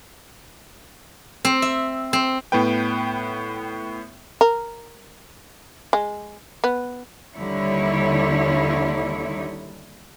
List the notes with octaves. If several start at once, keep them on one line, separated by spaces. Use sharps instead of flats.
C4
E5
C4
A2 B3 B4 G5
A#4
G#3
B3
D#2 D3 G3 D#4 E4 C#5